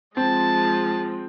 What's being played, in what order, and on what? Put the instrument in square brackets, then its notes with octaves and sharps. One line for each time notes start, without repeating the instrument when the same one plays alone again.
[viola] F3 G#3 [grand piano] C4 [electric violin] A5